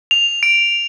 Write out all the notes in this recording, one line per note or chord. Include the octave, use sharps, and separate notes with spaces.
F7
D7